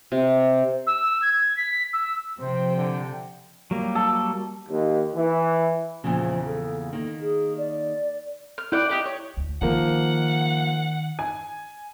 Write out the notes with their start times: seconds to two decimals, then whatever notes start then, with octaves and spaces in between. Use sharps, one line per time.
0.12 C3
0.87 E6
1.22 G#6
1.57 B6
1.93 E6
2.40 C3 F3 C5 G5
2.77 D3
3.71 F#3 G3 A#3
3.95 A4
4.70 D#2
5.15 E3
6.04 E2 A#2 C#3 F3
6.46 A4
6.93 D#3 A#3
7.21 G#4
7.57 D5
8.58 F6
8.72 E4 D5 F#5 G5
8.89 D#4 G4 D5
9.06 C#5
9.37 D2
9.62 D#3 F3 A#3 F#5
11.19 G#5